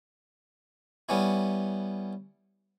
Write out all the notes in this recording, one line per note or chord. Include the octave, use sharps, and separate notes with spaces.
G3 B3 C#4 E4